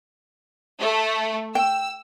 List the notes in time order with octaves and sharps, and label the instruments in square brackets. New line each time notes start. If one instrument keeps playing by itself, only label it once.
[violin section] A3
[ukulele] G5 [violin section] E6